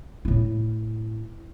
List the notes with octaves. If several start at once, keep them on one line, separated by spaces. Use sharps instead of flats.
A2 E4